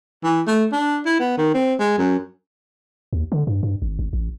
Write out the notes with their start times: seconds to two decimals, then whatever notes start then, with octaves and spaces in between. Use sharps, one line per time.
0.24 E3
0.47 A3
0.73 D4
1.06 E4
1.20 B3
1.38 D#3
1.54 C4
1.80 G#3
1.98 F#2
3.13 D#2
3.32 D3
3.47 G2
3.63 G2
3.82 G#1
3.99 G#1
4.13 A1